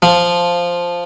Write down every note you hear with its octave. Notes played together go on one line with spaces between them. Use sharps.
F3